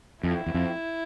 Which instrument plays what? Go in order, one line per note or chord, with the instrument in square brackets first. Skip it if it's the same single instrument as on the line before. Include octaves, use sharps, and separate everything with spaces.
[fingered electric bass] F2 [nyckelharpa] E4
[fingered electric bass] E2
F2